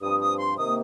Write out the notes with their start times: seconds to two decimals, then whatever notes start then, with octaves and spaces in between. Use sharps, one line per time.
0.01 G2 F3 C4 D#6
0.20 D#6
0.39 C6
0.57 C3 D#3 A#3 D#6